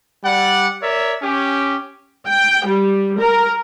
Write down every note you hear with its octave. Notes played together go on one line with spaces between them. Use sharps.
G3 D5 F#5
A#4 C#5 D5 E5
C#4 G4
G5
G3
A#4